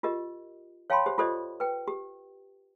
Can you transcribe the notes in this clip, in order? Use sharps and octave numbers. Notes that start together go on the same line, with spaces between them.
F4 G4 A#4 D#5
C#5 F5 G5 A5 B5 C6
G4 C5
F4 G4 A4 C5 D5 D#5
B4 G5
G4